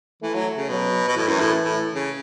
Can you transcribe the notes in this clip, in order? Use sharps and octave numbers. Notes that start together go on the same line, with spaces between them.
E3 A3
F#3
C#3
B2 F#3
B2
A2 E3
F#2
A2
A2
C#3